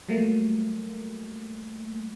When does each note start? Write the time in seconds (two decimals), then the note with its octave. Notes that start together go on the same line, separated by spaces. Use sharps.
0.09 F#3 G3 A3 A#3